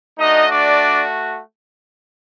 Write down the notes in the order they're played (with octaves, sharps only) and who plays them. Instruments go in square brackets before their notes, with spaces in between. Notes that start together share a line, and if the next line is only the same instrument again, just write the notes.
[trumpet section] A3 D4 D#4 F#4 D#5
D4 D5